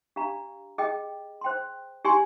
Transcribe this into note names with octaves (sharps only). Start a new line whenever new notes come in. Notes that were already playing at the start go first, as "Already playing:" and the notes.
D4 G4 D5 F5 A#5
G#4 D#5 G5
C5 G5 C6
G4 D5 G#5 C6